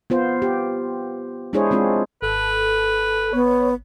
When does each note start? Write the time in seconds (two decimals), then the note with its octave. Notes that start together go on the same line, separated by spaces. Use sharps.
0.10 B3 F4 C5
0.42 G4
1.53 G#3 D4 E4 G#4 C5 C#5
1.71 G#3 C4 D4 F4
2.22 G#1 A4 B4
3.33 B3 C#5